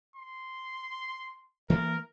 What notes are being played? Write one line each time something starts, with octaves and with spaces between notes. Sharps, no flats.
C6
E3 A3 A#3 A#4